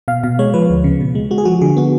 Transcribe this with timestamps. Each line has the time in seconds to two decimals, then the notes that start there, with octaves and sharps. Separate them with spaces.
0.08 B2 F5
0.24 B2 F5
0.39 G#3 C#5
0.54 F3 B4
0.70 D2
0.84 C#3
1.01 B2
1.15 G#3
1.31 G#3 F#4
1.38 G#4
1.45 F3 F#4
1.61 D3 G#4
1.77 B3 F#4